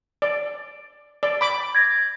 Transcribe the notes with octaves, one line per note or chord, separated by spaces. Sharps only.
D5
D5
B5 D6
G#6 A#6